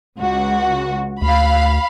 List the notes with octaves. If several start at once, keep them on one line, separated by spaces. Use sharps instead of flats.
C#2 F#4
D2 F5 B5